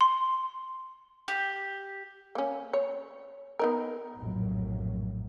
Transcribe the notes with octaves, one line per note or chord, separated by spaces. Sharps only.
C6
G4
A#3 C#4
C#5
B3 D#4 A#4
F1 A#1 F#2 A2 F#3